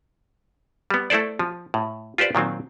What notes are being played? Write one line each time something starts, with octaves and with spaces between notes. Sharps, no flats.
G3 B3
A3 E4 A4 C5 D5
F3
A2
F4 G4 B4 C5 D5
A#2 D#3 F#3 C4